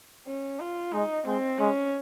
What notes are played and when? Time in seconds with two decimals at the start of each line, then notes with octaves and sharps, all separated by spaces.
0.27 C#4
0.60 F4
0.93 G#3 D#4
1.27 G#3 C4
1.60 G#3 C#4